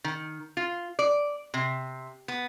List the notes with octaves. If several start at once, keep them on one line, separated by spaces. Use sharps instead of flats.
D#3
F4
D5
C3
B3